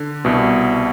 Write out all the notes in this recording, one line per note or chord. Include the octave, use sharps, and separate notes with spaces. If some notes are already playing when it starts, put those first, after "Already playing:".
Already playing: D3
C2 B2